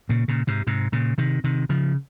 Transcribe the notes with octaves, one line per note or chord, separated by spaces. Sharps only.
A#2 C#3
A#2 C#3
G#2 C3
G#2 C3
A#2 C#3
C3 D#3
C3 D#3
C#3 F3